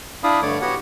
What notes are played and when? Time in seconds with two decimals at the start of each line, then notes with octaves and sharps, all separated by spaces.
0.24 D4 E4 D5 F5 B5 D#6
0.42 G2 D3 A3 C#5 D5 D6
0.61 B3 F#4 G4 C#5 F#5